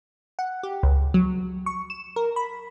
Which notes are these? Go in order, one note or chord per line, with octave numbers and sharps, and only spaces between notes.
F#5
G4
C#2
F#3
C#6
E7
A#4
B5